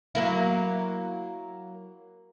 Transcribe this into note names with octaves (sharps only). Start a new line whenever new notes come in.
F#3 A#3 E4